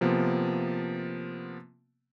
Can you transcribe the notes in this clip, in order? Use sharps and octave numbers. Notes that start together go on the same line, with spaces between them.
C3 F3 A#3 B3